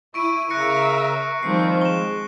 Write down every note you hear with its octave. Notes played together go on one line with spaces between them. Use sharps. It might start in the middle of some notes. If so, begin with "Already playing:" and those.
E4 C#6 D7 D#7
C#3 A#4 E5 F#6 A#6 C#7
C7
D#3 F3 G3 C4 C7
G#3 E7 G7